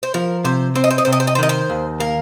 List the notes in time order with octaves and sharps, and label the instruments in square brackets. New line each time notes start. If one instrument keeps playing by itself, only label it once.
[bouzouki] C5
[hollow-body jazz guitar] F3 [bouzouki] A#4
[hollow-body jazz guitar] C3 [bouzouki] C5
[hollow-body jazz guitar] C4 [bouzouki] C5
[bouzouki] D#5
C5
D#5
[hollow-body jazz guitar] C3 [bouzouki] C5
[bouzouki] D#5
C5
D#5
C5
[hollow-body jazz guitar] D#3 [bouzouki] D#5
[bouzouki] C5
[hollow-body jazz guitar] D#2
[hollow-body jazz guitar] A#3 [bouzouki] A#4